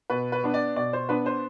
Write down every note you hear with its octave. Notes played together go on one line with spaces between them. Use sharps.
B2 B4
B4
B3 D4
D5
B2 D5
C5
B3 D4 B4
C5